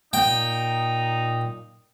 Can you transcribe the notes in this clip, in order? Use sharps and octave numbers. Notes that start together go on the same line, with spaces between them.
A#2 D#4 G5